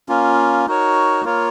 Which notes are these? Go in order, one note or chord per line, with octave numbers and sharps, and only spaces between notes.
A#3 C#4 F4
D#4 F#4 A#4 C#5
A#3 F4 A#4 C#5